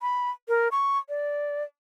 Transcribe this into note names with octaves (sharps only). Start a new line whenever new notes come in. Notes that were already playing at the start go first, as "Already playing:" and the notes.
B5
A#4
C#6
D5